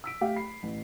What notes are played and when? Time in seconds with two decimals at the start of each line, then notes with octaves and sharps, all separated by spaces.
0.04 E6 B6 D7
0.21 A3 G4 F5
0.36 B5 C7
0.63 A1